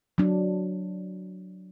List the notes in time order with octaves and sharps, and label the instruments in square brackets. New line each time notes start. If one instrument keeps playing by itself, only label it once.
[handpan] F#3 D4